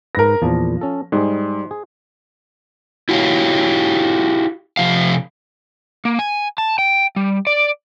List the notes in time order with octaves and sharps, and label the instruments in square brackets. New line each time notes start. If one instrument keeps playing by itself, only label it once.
[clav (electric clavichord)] G#2 B4 [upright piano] A#4 A#6
[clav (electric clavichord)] E2 A#2 [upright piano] F3
[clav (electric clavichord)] C#4 A4
[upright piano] G#2 [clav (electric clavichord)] G3 G#4
[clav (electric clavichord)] G#4
[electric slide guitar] E4 F#4 G4 C#5 F5
C3 F3 F5
A#3
G#5
A5
G5
G3
D5